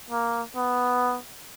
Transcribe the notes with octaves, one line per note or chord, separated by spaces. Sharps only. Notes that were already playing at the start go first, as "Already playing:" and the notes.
A#3
B3